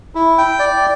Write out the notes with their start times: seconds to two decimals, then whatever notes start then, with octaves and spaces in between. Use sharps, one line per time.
0.15 E4
0.38 G5
0.59 D5